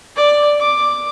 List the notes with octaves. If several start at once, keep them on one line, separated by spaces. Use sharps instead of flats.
D5
D6